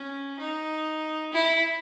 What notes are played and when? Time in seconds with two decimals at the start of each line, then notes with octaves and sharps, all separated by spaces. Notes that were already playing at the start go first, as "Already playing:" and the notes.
Already playing: C#4
0.39 D#4
1.33 E4